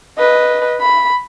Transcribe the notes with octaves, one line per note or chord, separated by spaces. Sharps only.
B4 D#5
B5